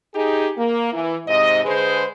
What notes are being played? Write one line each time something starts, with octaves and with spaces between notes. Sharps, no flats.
D#4 G4 G#4
A#3
E3
G#2 C3 D#5
D3 G#3 G#4 B4 C5